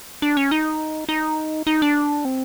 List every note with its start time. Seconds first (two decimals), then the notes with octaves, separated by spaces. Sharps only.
0.22 D4
0.37 C#4
0.51 D#4
1.09 D#4
1.67 D#4
1.82 D4
2.25 C4